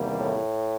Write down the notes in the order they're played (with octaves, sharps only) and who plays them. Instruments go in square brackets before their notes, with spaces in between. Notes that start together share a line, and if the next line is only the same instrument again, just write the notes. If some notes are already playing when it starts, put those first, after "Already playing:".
Already playing: [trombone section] E2 C3 D#3 G3 A#3
[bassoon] A2